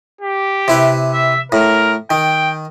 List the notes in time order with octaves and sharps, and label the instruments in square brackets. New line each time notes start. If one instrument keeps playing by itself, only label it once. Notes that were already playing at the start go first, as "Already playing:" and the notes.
[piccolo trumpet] G4
[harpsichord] C3 E4 B4
[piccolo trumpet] E5
[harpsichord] A2 [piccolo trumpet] A#4
[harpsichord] D#3 [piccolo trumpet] G5